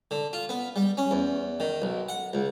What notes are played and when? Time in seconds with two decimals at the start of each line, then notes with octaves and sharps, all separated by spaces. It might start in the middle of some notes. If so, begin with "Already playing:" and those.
0.11 D3
0.33 F4
0.49 B3
0.76 G3
0.97 C#4
1.11 E2
1.60 D#3
1.82 B1
2.09 F#5
2.33 C#2